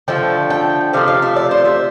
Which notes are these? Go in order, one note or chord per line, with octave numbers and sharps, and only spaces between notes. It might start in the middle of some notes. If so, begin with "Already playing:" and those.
D3 F3 A3 G5
G5
C3 F3 A3 F5
F5
E5
D5
C5
E5